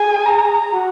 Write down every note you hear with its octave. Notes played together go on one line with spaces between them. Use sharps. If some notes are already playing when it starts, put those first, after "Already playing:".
Already playing: G#4 G#5
A#5
F#4